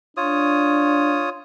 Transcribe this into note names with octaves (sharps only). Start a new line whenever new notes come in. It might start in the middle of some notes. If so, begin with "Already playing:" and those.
D4 F4 C#5 D#6